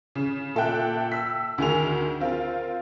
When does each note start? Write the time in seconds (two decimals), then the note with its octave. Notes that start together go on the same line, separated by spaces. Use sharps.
0.15 C#3
0.55 A#2 A4 E5 G5 F#6
1.12 E6 B6
1.58 D2 D#3 G#4 A#4 F7
2.20 C4 F4 A#4